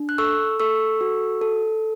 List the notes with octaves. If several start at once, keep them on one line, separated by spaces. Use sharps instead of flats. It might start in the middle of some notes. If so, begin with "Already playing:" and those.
Already playing: D4
F#6
A4 C#6 E6
A4 C#6 E6
F#4
A4